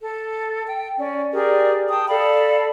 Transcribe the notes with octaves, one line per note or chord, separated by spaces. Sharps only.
A4
G5
C#4 D5
G4 G#4 A#4 D5
G5 A5 D#6
A4 D5 F5 B5